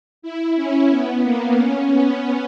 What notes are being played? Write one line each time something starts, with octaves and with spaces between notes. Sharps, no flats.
E4
C#4
B3
A#3
C#4
B3